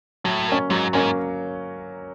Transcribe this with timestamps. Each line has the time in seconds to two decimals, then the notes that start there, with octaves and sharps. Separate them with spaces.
0.24 A2 F#3
0.47 A#3 C#4
0.70 G#2 F#3
0.93 G#2 A#3 C#4